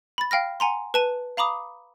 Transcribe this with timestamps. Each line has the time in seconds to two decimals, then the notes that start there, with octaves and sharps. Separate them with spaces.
0.18 B5 A6
0.31 F5 G5 F6 A#6
0.60 F#5 G#5 A#5 C6
0.94 B4 A5 D#7
1.37 F5 A#5 B5 D6 D#6